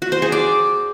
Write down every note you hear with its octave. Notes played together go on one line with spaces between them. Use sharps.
F#4
C5
G#4
D5